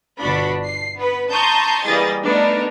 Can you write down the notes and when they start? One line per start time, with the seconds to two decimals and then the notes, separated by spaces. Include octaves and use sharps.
0.19 G1 B2 D4 F#4 B5
0.66 C7
0.98 B3 B4
1.31 A5 A#5 C6 C#6 D#6 G6
1.85 E3 G3 A#3 G#4 D#5 A6
2.24 A3 B3 D4 D#4 A#4